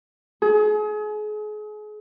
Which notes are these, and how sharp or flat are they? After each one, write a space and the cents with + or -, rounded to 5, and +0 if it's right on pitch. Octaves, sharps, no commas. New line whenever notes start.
G#4 +35